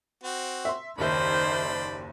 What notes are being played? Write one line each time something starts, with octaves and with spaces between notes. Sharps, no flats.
C4 F#4
E5 C6
F#1 D#2 D#3 C5 D5 E5 A5 B5